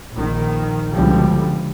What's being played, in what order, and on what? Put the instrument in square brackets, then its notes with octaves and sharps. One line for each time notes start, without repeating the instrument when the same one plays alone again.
[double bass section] A#1 D#3
C#2 B2 D3 F3 G3